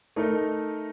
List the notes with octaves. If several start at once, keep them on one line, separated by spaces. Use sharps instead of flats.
A3 D#4 A#4 D#5